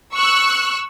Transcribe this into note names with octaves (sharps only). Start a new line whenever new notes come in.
C#6 E6 F#6